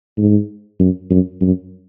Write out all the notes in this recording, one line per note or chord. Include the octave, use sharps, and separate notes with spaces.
G#2
F#2
F#2
F#2